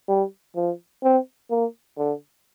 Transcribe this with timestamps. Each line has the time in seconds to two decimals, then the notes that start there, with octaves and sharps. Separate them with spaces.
0.08 G3
0.56 F3
1.03 C4
1.51 A#3
1.98 D3